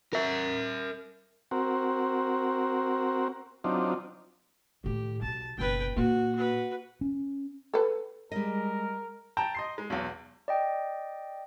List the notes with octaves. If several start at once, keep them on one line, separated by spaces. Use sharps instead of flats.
A#4 E5
C4 F#4 A#4
F#3 C4 D4 D#4 F4
A2 D#3 G4
B1 A5
F#1 B1 B4 G5
A#2 A#3 F#4
F#4 B4
C#4
A4 B4
G3 G#3 A#4 D#5
G5 A5 A#5
D#5 C6 C7
G#3
B1 E2
D5 D#5 G5